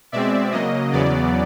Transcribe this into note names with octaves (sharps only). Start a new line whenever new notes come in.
B2 G#3 C4 D5 E5
C#3 F#3 A#3 D#5
E2 C#3 F#3 B3 D5